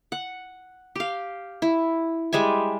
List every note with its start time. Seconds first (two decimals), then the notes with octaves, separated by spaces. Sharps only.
0.12 F#5
0.96 G4 F5
1.62 E4
2.33 G3 G#3 E5 G#5